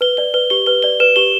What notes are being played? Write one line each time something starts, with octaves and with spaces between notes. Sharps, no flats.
B4 G7
D5 G7
B4 G7
G4 G7
B4 G7
D5 G7
B4 E7
G4 G7